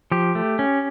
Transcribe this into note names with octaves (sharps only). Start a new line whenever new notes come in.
F3 G4
A3
C#4